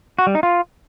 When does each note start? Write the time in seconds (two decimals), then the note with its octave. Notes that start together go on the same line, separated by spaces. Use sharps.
0.19 F#4
0.27 G3
0.35 D#4
0.43 F4